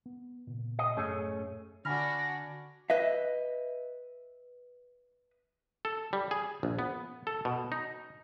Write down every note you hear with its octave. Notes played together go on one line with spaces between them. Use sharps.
B3
A#2 C#3 B3
D#5
F#2 A2 A3 C#4 G#4
D3 D4 F#4 D5 G#5 B5 F6 A#6
B4 D#5 E5
A4
G3
G#4
A#1
B3
A4
B2
D#4